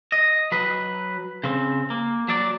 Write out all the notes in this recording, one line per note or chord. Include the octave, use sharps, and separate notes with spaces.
D#5
F#3 B4
C#3 C4
A#3
F#3 D5